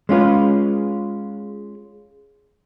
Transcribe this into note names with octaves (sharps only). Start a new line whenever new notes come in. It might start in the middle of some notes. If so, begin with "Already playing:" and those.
G#3 C#4 F4 B4